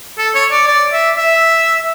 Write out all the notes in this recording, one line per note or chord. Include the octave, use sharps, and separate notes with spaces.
A4
C#5
D5
D5
E5
E5